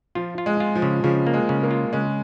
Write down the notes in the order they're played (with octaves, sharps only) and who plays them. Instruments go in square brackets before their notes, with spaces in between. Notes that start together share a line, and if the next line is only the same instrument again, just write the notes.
[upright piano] F3 [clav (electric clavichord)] F4
[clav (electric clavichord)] F4
[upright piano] G#3
[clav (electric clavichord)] F4
[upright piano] F3
[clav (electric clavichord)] C#3
[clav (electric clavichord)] C#3 [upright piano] F3
[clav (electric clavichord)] A#3
[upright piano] G#3
[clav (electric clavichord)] C#3
[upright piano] A#3
[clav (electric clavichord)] F4
[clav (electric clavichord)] C#3 [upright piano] G#3